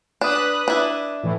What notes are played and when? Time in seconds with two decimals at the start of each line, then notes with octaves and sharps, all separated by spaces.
0.21 D4 B4 D#6 F#6
0.68 D4 E4
1.23 A2 E3